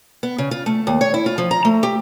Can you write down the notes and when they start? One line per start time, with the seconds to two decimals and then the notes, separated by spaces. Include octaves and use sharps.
0.23 B3
0.38 C#3
0.51 F4
0.66 A3
0.87 D#2
1.01 C#5
1.14 E4
1.26 F4
1.38 F3
1.51 A#5
1.65 A3
1.83 G4